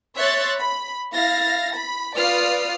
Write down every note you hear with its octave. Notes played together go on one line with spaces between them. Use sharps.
C#5 E5 C6 F#6 A6
B5
E4 F5 A6 A#6
B5
F4 B4 D5 D#6 F6 C7